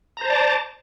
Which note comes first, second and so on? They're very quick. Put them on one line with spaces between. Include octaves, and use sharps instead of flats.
A#5 C5 A5 D5